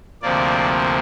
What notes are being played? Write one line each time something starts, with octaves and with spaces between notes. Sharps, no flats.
D2 C3 F3 A#3 D5